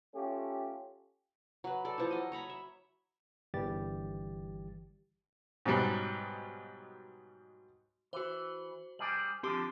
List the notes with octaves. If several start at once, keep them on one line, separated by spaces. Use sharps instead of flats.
A3 C#4 F4 G4
F#3 B4
A4 D5
E3 F3 A4
F#3 D#5
C#5 A#5 B5
E5
G1 E3 G3 G4 A6
G#2 B2 F#3 G3
E3 F#4 C5
G3 G#4 D5 F#7
D3 F3 C4 G4